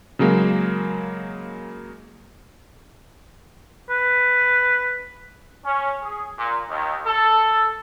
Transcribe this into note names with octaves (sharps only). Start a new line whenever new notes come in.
C#3 F#3 G#3 A#3
B4
C#4
G#4
A#2
D#2
A4